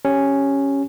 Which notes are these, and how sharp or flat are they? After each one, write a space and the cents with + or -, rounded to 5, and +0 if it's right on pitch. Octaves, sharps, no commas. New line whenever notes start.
C#4 +0 G4 +0